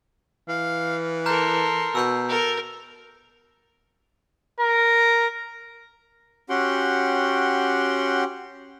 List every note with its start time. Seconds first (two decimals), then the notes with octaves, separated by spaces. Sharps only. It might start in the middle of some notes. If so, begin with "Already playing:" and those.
0.49 E3 F5
1.26 A4 A#4 A#5 C6 F6 G6
1.95 B2 E6 G6
2.29 A4 A#4
4.60 A#4
6.50 C#4 F#4 G4 F#5 G5 C6